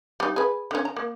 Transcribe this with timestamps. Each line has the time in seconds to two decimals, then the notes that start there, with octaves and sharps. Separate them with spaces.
0.20 G3 D#4
0.36 G#4 B4
0.71 D3 C#4
0.85 A#5
0.96 A#3